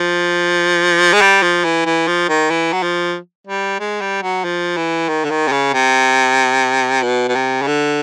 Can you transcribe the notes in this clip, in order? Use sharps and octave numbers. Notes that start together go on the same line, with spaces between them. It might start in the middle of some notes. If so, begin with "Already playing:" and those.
Already playing: F3
G#3
G3
F3
E3
E3
F3
D#3
E3
F#3
F3
G3
G#3
G3
F#3
F3
E3
D#3
D3
D#3
C3
C#3
C3
B2
B2
C3
C#3
D3